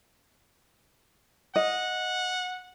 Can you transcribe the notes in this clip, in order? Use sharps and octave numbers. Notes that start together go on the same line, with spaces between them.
D#5 F#5